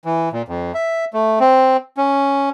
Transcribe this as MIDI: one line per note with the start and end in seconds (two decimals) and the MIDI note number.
0.05 0.29 52
0.33 0.42 46
0.48 0.72 41
0.74 1.05 76
1.13 1.39 57
1.40 1.77 60
1.97 2.49 61